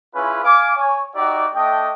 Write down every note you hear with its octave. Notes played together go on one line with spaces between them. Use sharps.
C#4 E4 F4 G#4 B4
F5 G#5 D6
C#5 G#5
D#4 F#4 G4 D5 E5
A3 D4 D#5 G5